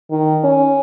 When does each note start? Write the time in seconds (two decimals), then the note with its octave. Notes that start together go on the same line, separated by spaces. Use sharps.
0.11 D#3
0.44 C#4